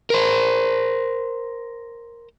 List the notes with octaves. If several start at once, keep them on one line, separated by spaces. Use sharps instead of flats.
A#4 C5